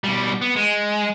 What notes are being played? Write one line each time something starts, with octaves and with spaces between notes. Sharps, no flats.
B2 G3
B3
G#3